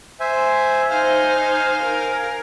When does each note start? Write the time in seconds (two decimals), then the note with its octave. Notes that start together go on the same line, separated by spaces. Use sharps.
0.20 C5 E5 G#5
0.90 D#4 C5 F5 G#5 F6
1.83 A#4